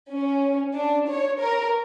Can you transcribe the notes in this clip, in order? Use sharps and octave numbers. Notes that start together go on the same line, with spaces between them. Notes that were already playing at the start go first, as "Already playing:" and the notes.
C#4
D4
C#5
A#4